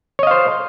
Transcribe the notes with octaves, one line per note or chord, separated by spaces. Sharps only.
C5 C#5 D#5 F5